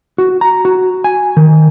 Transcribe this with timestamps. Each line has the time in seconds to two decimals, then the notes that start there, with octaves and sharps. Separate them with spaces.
0.18 F#4
0.41 A#5
0.65 F#4
1.04 G#5
1.37 D#3